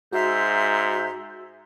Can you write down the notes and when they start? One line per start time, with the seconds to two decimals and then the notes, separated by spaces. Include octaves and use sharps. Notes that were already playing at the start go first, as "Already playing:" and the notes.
0.13 G#2 F#4 E5 A#5 C6 E6 G6